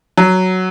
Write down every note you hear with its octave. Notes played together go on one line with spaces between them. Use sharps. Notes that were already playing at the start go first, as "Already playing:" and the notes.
F#3